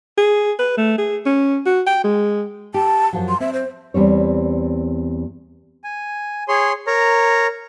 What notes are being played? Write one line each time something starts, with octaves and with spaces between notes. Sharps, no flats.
G#4
B4
A3
G#4
C#4
F#4
G5
G#3
G4 A5
F#2 F3 F#3
C6
C4 E5
C5
E2 G3 C4 C#5
G#5
G#4 C#5 C6
A#4 C#5 A#5